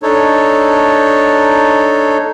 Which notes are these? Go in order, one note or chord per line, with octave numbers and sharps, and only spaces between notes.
D4 D#4 A4 C#5